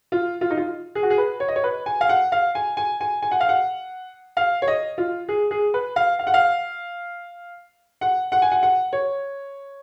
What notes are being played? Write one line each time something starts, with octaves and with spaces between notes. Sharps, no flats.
F4
F4
D#4
F4
G#4
F#4
G#4
B4
C#5
D#5
C#5
B4
G#5
F5
F#5
F5
G#5
G#5
G#5
G#5
F#5
F5
F#5
F5
C#5
D#5
F4
G#4
G#4
B4
F5
F5
F#5
F5
F#5
F#5
G#5
F#5
F#5
C#5